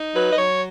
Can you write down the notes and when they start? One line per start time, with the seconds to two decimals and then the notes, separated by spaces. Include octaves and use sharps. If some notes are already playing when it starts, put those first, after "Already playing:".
Already playing: D#4
0.15 F#3 B4
0.32 D#5
0.36 F#3 C#5